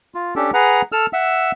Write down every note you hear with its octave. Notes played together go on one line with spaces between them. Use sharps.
F4
C#4 D4 G4 A4
G#4 B4 F#5 A#5
A4 E6 F6
E5 F#5 E6